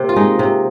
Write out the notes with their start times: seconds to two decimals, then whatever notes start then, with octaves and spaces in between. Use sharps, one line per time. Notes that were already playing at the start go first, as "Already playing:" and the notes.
Already playing: C3 A#3
0.09 F4
0.16 G#3 D#4
0.39 C3